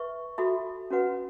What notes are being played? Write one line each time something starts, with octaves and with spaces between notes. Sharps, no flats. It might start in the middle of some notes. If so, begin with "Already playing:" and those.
Already playing: B4 E5 C#6
F#4 A4 E5 B5
C#4 F#4 B4 F#5